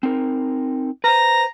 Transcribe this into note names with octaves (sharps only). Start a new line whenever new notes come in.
C4 D#4 A#4
B4 C5 A#5